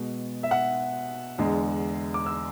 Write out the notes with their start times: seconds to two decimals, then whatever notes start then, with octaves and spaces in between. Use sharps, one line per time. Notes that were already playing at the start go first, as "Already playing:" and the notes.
Already playing: B2 G#3
0.43 E5
0.51 F#5
1.38 E2 D3 G#3
2.14 D6
2.26 E6